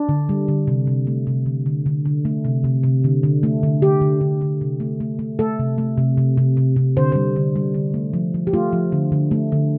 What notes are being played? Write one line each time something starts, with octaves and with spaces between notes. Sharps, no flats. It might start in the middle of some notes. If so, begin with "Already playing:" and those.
Already playing: D4
D3
G3
D3
C3
C3
A3
C3
D3
D3
D3
D3
A3
C3
C3
C3
D3
D3
A3
D3
D3 G4
D3
D3
D3
C3
A3
A3
A3
A3 A4
C3
A3
C3
C3
C3
C3
C3
D3 C5
G3 C5
D3
G3
D3
A3
F3
F3
G4
A3 F4
F3
D3
D3
A3
D3